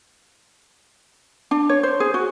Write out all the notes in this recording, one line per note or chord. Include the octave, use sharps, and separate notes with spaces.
D4
C#5
C5
G#4
F#4